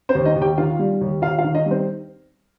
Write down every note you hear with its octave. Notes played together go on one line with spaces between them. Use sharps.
C4 C5
D#2
D#4 D#5
D#2
G4 G5
D#3 F4 F5
G3
D#2
D#2 F4 F5
F4 F5
D#3
D#4 D#5
G3
C4 C5